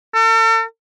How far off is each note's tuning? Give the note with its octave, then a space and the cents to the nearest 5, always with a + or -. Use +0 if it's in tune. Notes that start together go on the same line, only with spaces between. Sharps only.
A4 +40